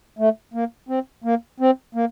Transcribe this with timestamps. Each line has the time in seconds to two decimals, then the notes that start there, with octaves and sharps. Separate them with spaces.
0.19 A3
0.54 A#3
0.89 C4
1.24 A#3
1.60 C4
1.95 A#3